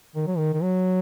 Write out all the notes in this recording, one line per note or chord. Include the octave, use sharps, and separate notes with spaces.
D#3
F#3
D#3
D#3
F#3